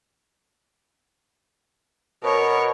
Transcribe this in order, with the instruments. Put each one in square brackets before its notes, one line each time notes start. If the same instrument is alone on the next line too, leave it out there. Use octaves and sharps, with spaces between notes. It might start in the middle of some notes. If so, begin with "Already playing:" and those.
[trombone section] B2 [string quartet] A#4 C#5